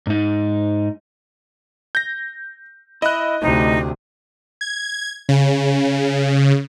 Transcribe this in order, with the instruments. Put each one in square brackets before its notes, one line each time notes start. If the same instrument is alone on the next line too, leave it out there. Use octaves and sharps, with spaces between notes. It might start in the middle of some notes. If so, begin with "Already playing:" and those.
[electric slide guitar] G#2 D#4
[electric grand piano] G6 A#6
[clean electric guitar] E4 [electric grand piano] D#5 F#6
[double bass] D2 C3 [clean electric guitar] A2 [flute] D#4
[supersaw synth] G#6
C#3